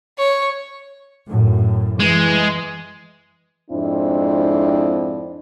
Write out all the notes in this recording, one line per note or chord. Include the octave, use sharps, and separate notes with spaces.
C#5
F#2 A2
E3 G#3
F2 G#2 C4 D4 E4